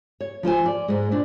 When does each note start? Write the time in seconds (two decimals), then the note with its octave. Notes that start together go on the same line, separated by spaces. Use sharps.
0.20 C#5
0.43 F3 F4 C5 G#5
0.66 D5
0.88 G#2 G#3
1.11 A#2 D4